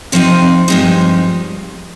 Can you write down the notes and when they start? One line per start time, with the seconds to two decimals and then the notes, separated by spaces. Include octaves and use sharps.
0.12 C3 F3 C4 D#4 C5
0.68 G2 F3 G#3 D#4